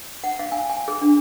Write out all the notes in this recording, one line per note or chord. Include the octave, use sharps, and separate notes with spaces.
F#5
F5
G#5
G#5
G#4
D4